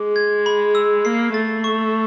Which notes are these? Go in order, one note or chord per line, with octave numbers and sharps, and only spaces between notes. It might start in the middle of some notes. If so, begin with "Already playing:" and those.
Already playing: G#3 D6
G#6
B5
E6
A#3 C7
A3 A6
C#6